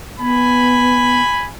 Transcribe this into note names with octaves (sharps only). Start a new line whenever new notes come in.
B3 G#5 B5